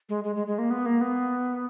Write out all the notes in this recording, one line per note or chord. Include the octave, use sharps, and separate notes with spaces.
G#3
G#3
G#3
G#3
A#3
B3
A#3
B3